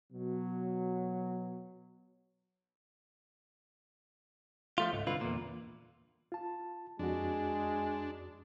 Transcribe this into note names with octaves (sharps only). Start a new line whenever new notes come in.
B2 F#3
F3 A3 F4
C#2 G#2
C2 D3 F4 B4
E2 A#2
F4 A5
F2 G#3 D4 F#4